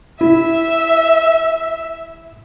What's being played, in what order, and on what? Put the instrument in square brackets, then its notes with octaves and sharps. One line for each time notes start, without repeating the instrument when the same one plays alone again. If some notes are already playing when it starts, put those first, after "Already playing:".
[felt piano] E4 [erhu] E5